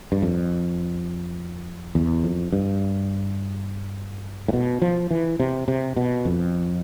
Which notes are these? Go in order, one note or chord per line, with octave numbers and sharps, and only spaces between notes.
G2
F2
E2
F2
G2
A2
B2
F3
E3
C3
C3
B2
F2